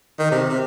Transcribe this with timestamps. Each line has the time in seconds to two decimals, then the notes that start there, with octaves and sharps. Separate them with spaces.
0.19 D#3
0.31 C3
0.49 C3